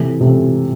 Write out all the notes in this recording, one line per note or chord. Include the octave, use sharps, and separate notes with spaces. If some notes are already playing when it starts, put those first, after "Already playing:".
Already playing: C3 E3 A3
C3 E3 A3